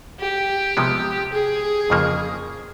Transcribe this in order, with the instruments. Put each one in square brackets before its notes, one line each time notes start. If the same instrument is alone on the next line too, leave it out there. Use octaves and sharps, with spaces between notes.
[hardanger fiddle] G4
[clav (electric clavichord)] C3 F3 G#3 B3
[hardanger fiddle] G#4
[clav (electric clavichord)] F2 C#3 F3 A#3